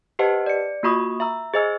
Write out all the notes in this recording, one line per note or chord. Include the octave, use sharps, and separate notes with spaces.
G4 B4 C5 D#5 F#5 A5
D5 C#7
A#3 F4 F#4 B5 C#6 D#6
E5 A#5 E6
G#4 C5 D#5 G#5 E6